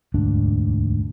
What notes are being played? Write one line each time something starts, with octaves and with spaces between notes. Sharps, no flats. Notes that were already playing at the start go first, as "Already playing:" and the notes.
E1 D2 G#2 D4